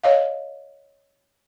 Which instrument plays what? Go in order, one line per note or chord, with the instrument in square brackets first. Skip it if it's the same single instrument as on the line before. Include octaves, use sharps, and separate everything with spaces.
[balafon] C#5 D#5 F5